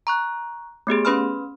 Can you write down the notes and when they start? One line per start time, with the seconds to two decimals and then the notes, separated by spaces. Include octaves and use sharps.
0.07 A#5 C#6 F#6
0.87 A3 B3 G4 G#4
1.05 C#4 B4 B5 C6 F6